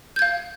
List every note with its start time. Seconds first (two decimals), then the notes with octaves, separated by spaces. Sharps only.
0.16 G6
0.19 G#6
0.22 F5